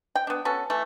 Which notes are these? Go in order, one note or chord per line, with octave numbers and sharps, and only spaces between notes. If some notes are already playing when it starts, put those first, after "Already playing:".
G5
B3 D4
B3 C#4 F#4 A4
E3 A3